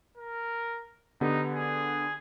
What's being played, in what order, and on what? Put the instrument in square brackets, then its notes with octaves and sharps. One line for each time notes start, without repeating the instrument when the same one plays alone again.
[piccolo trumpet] A#4
[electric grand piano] D3 B3 G4 [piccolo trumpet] D#4
[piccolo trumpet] G#4